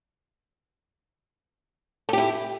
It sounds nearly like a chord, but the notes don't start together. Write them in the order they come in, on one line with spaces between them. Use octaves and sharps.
A4 G4 E4